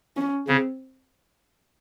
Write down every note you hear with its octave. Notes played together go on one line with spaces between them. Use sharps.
C#4
C#3 C4